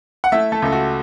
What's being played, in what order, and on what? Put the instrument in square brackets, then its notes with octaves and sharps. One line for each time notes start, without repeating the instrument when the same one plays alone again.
[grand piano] F#5
A3 E4 E5
A3 A4
C#2 A4
F#4